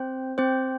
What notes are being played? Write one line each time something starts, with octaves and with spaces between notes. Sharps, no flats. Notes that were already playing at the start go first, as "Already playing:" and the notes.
Already playing: C4 C5
C4 C5